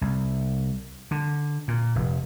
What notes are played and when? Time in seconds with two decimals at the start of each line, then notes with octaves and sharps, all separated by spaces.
0.01 C2
1.11 D3
1.68 A#2
1.95 F1